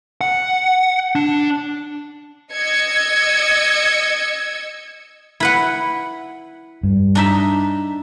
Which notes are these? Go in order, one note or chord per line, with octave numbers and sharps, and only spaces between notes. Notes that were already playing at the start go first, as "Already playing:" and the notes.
F#5
D4
D#5 E6 G#6 C#7
E4 B4 F#5
G2
D4 D#4 E5